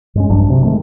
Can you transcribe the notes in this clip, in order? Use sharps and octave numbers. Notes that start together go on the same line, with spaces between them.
G2 G#3 C#4
A#1 G2 F#3 D4
C3
D#3 G#3 A3